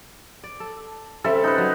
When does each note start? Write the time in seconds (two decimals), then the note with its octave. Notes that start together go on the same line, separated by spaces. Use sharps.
0.44 D5
0.60 A4
1.24 C#3 G3 C4 A4 E5
1.44 D#4 B4
1.58 F#3